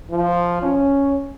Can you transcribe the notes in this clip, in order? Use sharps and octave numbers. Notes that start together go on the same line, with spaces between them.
F3
C#4